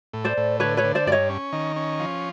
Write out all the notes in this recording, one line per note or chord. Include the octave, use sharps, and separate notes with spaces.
A2
C5 D5
A2
D3 B4 C#5
B4 C#5
D3
C5 D5
G2 D5
C#5 D#5
C#4
D#3
C#4
F3